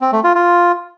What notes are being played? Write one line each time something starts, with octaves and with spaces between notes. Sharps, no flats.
C4
A3
F4
F4